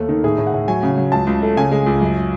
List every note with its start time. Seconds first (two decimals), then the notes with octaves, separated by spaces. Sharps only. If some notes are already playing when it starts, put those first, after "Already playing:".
Already playing: D#2 A3
0.09 D#3
0.24 A2 G#4
0.38 A2
0.46 F#5
0.54 A2
0.68 F#3 G#5
0.83 C#3
0.97 F#3
1.12 C#2 A5
1.27 C#2
1.43 A3
1.57 C#3 G#5
1.72 G#3
1.86 C#2
2.01 F#2